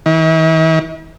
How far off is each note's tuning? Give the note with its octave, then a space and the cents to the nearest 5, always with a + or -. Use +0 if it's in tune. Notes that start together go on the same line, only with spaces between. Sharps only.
E3 -45